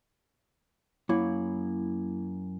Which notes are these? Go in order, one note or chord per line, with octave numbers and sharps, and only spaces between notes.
F#2 A#3 E4 C#5